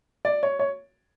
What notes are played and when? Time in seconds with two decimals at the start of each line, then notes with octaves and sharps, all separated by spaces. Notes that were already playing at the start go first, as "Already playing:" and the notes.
0.25 D5
0.43 C#5
0.59 C#5